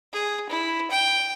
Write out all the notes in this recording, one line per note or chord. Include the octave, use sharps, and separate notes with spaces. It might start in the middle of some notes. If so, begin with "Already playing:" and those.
G#4
E4
G5